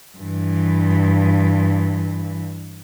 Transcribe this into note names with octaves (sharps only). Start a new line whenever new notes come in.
G2 E3